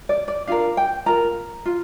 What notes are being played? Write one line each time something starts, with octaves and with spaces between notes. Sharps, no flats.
D5
D5
D4 F4 A#4 F5
G5
F4 A#4 A#5
F4